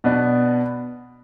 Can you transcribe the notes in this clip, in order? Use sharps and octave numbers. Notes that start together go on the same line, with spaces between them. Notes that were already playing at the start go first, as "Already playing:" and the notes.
B2 B3 D4